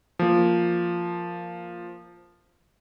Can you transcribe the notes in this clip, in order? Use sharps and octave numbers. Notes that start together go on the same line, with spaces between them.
F3 A#3